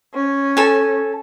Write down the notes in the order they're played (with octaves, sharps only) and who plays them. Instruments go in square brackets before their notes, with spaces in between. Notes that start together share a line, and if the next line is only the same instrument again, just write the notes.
[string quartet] C#4
[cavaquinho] A4 G#5